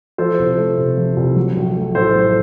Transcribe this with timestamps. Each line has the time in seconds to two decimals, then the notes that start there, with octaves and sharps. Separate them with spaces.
0.18 F3 A4 C5
0.39 C2
0.58 A3
0.78 C3
0.97 F3
1.16 C2
1.36 F#3
1.56 A#1
1.76 A3
1.95 A2 A4 C5
2.15 F#3